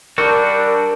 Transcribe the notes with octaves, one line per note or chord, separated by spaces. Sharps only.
G3 D4 F#4 A#4 C#6 E6 G6